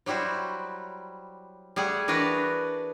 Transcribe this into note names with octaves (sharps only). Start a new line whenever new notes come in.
F#3 G3 E4 F#4 C5
G3 A3 G#4 F#5
E3 D4 F#4 A#4 B4 D#5